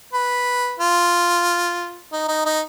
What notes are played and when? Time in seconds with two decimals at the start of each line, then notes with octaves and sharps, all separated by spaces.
0.13 B4
0.79 F4
2.13 D#4
2.28 D#4
2.45 D#4